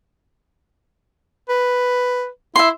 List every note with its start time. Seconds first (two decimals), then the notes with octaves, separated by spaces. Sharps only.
1.49 B4
2.56 E4 E5 C6